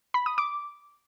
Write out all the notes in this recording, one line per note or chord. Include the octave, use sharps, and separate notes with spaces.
B5
D#6
D6